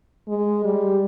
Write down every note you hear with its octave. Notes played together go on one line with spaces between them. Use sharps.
G#3
G3